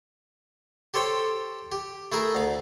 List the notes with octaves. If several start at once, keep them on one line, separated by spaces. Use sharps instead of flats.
G4 A4 C5 C#5 G5
G4
A3 E4 G#4 A#4
D2 F5